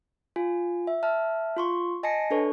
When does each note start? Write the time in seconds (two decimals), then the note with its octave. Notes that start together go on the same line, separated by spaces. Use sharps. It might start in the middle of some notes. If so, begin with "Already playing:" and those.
0.36 F4 G#5
0.87 E5
1.03 E5 A5 F6
1.57 F4 C6 C#6
2.03 D#5 G#5 A5 A#6 C7 C#7
2.30 D4 A4 B4 C#5 C#6